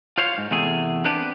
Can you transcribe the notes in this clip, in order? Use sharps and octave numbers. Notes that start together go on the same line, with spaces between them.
F4 C5 C#5 F5
G#2
E2 C3 A3 G#4
B3 C4 D4 G4 B4 C5